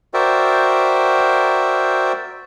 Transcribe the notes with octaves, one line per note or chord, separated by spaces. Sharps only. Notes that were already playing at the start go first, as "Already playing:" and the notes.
F#4 A#4 C5 D5 E5 G5